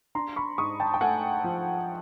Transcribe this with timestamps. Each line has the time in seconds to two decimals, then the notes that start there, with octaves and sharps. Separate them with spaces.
0.15 D4 A#5 C6
0.36 B5 C#6
0.58 G#2 C#6 D#6
0.80 G5 A5
0.94 G5
1.01 A3 F#5 G#5
1.44 F3